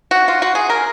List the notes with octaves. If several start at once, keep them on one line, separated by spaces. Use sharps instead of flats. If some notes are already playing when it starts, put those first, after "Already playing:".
F#4
F4
F#4
G#4
A#4